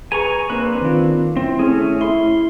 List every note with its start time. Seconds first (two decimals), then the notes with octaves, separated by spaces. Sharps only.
0.12 G#4 B4 G#5 A#5 C#6
0.50 A#3 C4 D4 B4
0.82 D#3 F4
1.37 C4 E4
1.59 A3 C#4 G#4
2.01 E4 C6